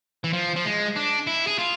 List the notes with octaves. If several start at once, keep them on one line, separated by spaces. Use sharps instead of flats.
E3
F3
F3
G#3
D4
E4
G#4
F4